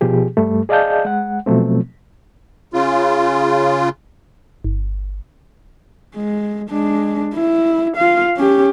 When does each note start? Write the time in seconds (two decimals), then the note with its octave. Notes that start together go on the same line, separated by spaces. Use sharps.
0.01 B2 F3 G4 G#4
0.37 G2 G3 A3
0.69 G#4 D5 D#5 F5 A5 G6
1.05 G#3 F#5
1.46 B2 F3 F#3 A3 C4
2.74 C#3 F4
4.64 G1
6.15 G#3
6.70 G#3 D4
7.35 E4
7.97 F4 F5
8.36 C#4 G4